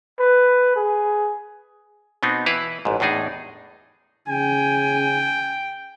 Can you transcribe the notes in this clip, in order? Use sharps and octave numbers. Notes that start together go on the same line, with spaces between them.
B4
G#4
B2 B3 C4 D#4
E3 E4 B4 F5
A1 G#2
E2 A2 D4 D#4 G#4
C#3 G5 G#5